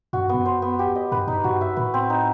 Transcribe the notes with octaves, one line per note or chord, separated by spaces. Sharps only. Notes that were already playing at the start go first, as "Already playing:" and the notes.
F#2 F#4
G2
B3
F#2
C5
B3
G4
D#5
G2 B4
G2 D#4
G2 F#4
E5
A2 B4
C4
D#4